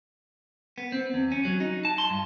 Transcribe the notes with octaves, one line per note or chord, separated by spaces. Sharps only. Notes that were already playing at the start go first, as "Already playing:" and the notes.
B3
C4
E2
C#4
F#3
D#4
A5
C6
G2